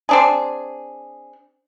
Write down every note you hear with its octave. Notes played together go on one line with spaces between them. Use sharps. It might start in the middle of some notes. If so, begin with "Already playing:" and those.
C4 D4 G#4